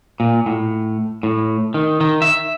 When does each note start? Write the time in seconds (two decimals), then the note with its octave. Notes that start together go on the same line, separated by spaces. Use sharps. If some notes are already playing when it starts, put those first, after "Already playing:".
0.20 A#2
0.46 A2
1.23 A2
1.74 D#3
2.01 D#3
2.22 E5